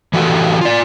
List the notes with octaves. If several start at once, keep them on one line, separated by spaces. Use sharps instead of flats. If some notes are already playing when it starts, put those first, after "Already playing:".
E3 F#4 G4 A4 B4
F4 D5